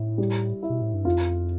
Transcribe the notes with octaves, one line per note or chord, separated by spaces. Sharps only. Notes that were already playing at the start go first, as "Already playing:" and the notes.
Already playing: A2 E4
G3
E4
B2
A2
G2
F2 F4